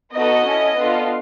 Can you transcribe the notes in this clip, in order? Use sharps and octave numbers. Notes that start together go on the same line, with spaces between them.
B3 D#4 F#4 A4 D#5
C#4 E4 A4
B3 D4 F4 A4